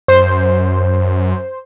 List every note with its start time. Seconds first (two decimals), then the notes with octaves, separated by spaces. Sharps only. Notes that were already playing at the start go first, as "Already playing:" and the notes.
0.08 F#2 C5